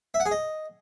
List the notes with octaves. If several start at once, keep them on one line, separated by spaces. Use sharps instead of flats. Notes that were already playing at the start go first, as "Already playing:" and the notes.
E5
F#5
G#4
D#5